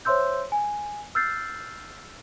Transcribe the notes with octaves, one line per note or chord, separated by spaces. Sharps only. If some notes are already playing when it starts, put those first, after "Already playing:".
C5 C#5 E5 C6 E6 G6
G#5
E6 F6 G6 A6 C7